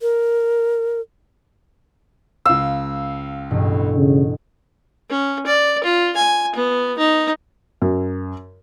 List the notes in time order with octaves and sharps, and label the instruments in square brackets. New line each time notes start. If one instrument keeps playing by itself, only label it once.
[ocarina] A#4
[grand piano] C#2 F5 [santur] E6
[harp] A1 G2 B2
[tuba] C#3
[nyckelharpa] C#4
D5
F4
G#5
B3
D#4
[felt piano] F#2